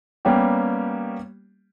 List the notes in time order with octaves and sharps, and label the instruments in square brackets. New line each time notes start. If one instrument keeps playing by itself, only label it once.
[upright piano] G3 A#3 B3 C#4 G4